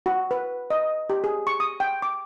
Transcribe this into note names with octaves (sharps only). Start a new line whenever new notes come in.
F#4
B4
D#5
G4
G#4
C#6
D#6
G5
D6